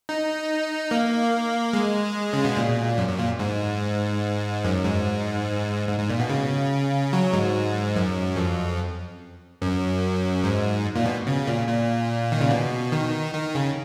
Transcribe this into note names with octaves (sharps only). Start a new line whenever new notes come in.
D#4
A#3
G#3
C#3
B2
A#2
F#2
F#2
A#2
G#2
F#2
G#2
G#2
G#2
A#2
B2
C#3
F#3
G#2
F#2
F2
F#2
G#2
A#2
B2
C#3
A#2
A#2
D#3
C#3
B2
D#3
D#3
C#3